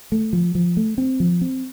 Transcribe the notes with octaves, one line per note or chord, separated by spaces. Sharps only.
A3
F3
F3
A3
C4
F3
C4